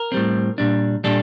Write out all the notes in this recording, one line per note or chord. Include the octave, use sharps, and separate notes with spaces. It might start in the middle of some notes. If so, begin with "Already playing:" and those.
Already playing: A#4
A2 G3 C4
A#2 G3 D4
A#2 G3 D4 A4